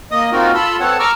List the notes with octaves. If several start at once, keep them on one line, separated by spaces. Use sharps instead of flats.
A#3 D#5 D#6
A#3 C4 D#4 F4 F#4 A#4
F4 A4 A5 B5 C6 E6
B3 C4 A4 C#5 F#5 A5
A#5 C#6 D6 E6 F6